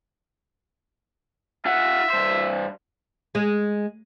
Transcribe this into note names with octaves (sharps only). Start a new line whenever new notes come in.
F4 E5 F#5
G2 C5
G#3